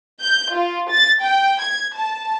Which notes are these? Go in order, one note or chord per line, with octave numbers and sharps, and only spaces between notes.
G6
F4
A6
G5
G#6
A5